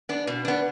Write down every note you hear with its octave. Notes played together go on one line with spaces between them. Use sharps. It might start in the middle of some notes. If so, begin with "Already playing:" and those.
B3 D4
B2
B3 D4